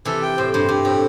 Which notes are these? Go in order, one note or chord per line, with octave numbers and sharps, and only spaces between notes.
C3 E3 A4
G5
A2 C5
G2 C5
G2 G4
A2 C4